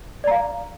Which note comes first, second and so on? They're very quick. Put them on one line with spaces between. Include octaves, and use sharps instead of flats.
D5 A#5 F5